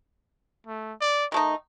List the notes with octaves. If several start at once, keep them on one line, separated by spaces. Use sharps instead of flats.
A3
D5
D#3 A3 D#4 D#5